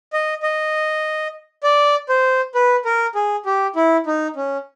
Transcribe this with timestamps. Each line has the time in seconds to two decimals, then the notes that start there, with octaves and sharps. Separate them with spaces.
0.13 D#5
0.43 D#5
1.63 D5
2.09 C5
2.55 B4
2.85 A#4
3.15 G#4
3.46 G4
3.76 E4
4.06 D#4
4.36 C#4